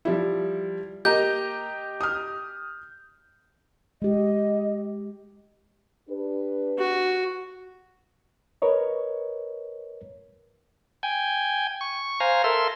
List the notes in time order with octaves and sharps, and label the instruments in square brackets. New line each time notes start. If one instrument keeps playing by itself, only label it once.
[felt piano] F3 G3 E4
[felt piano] A#3 [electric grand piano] G4 D#5 A#5 [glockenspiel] G6
[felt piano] D#6 F6
[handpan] G#3 G4 [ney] D#5
[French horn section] D4 G4 B4
[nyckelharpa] F#4
[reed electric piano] A#4 B4 C#5 D#5
[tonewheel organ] G5 G#5
C#6
C5 F5 G#5 A#5
A4 A#4 E5 C6